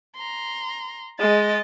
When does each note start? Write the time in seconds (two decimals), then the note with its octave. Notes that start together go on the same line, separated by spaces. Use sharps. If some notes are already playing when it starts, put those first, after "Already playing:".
0.16 A#5 C6
1.19 G#3 D#5 A6